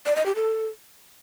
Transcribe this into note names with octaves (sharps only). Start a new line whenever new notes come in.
D5
D#5
G4
A4